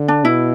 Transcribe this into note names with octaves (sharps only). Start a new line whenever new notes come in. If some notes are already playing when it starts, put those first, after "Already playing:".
Already playing: D3
D4
B2 E4